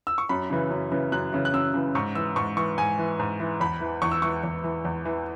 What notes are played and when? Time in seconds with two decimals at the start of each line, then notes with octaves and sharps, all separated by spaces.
0.07 E6
0.18 C#6
0.29 F#2 B5
0.50 C#3 E3
0.70 F#2
0.92 C#3 E3
1.12 F#2 F#6
1.33 C#3 E3
1.45 F#6
1.53 F#2 E6
1.74 C#3 E3
1.95 G#2 C#6
2.15 E3 E6
2.36 G#2 C#6
2.57 E3 C#6
2.78 G#2 G#5
2.98 E3
3.19 G#2
3.40 E3
3.60 E2 B5
3.81 E3
4.02 E2 C#6
4.12 E6
4.22 E3 C#6
4.44 E2
4.64 E3
4.85 E2
5.05 E3